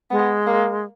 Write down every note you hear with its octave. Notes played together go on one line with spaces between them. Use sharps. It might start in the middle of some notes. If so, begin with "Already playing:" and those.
G#3 B3
A#3